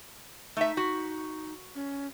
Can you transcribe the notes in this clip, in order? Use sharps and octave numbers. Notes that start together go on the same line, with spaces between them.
A3 D#4 E5
F#4
C#4